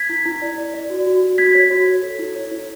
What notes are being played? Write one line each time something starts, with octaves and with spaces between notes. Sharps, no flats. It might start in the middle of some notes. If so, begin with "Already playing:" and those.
Already playing: G#6 B6
E4
E4
D5
D5
D5
F#4
F#4
F#4
F#4 G#6 B6
C#5
F#4
C#5
A4
E4
C#5
E4